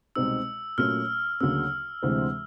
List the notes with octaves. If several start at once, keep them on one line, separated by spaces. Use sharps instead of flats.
C2 B2 G#3 C4 D#4 E6
A#2 F#3 A3 C#4 F6
D2 C#3 F#3 A#3 C#4 E6
D2 C3 E3 G#3 C4